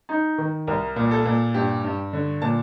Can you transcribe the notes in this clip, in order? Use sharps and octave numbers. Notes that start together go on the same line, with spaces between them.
D#4
D#3
C2 A#4
A#2
A4
A#2
G2 G4
G2
D3
A#2 A5